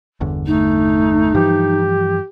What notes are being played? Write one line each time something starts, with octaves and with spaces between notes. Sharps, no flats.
G1 E2 D3
A3 D#4
G2 E3 F3 G4